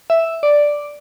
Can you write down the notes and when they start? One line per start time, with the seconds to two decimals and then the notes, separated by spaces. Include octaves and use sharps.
0.10 E5
0.43 D5